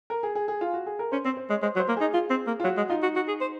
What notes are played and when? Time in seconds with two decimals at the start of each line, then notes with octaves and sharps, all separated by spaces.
0.10 A#4
0.23 G#4
0.35 G#4
0.48 G#4
0.61 F4
0.73 F#4
0.86 G#4
0.99 A#4
1.12 C#4 C5
1.25 C4 C5
1.37 C5
1.50 G#3 C#5
1.62 G#3 C5
1.75 F#3
1.79 C5
1.88 A#3
1.97 D#4 G#4
2.14 F4
2.30 C4
2.47 A#3
2.60 F4
2.64 F#3 F#4
2.77 G#3
2.89 D#4 F4
3.02 F#4
3.16 F#4
3.28 G#4
3.41 C5